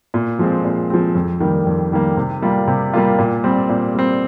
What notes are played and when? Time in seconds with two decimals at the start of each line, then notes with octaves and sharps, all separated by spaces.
0.14 A#2
0.39 F3 G#3 C4
0.65 A#2
0.90 F3 G#3 C4
1.15 F2
1.40 D#3 G3 A#3
1.67 F2
1.92 D#3 G3 A#3
2.17 C3
2.42 G3 A#3 F4
2.68 C3
2.94 G3 A#3 F4
3.19 A#2
3.44 G3 C4
3.69 A#2
3.95 G3 C4